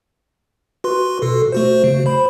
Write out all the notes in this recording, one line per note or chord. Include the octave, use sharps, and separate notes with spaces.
F#4 B4 C6
B2 A4
A3 F#4 C5
C#3
C5 B5